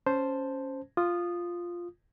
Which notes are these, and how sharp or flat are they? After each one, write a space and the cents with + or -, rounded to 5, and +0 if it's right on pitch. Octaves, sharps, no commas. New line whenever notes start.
C#4 +0 C5 +0 A5 +0
F4 +0 D#6 -15